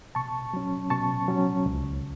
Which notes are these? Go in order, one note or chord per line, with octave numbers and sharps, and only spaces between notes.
B2 A5 C#6
F#3 C#4
B2 A5 C#6
F#3 C#4
C#2